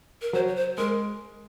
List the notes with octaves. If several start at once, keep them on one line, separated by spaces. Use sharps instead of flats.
A#4
F#3 C5
C#5
C5
G#3 A#4